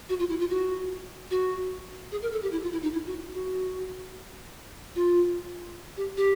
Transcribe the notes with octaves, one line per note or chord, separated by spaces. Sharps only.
F#4
F4
E4
F4
F#4
F#4
G#4
A#4
A4
G4
E4
F4
E4
D#4
E4
F#4
F#4
F4
G4
G4